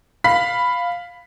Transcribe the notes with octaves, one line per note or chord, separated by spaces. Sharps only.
F5 B5 B6